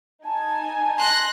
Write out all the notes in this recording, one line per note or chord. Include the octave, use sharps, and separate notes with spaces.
D#4 G#5 A5
C6 F#6 A#6